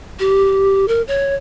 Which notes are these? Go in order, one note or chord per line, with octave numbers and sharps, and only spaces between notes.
G4
A#4
C#5